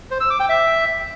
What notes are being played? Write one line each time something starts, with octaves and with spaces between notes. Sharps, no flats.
C5
E6
D6
G5
E5